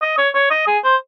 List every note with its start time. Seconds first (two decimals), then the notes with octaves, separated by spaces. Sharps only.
0.01 D#5
0.18 C#5
0.34 C#5
0.50 D#5
0.67 G#4
0.84 C5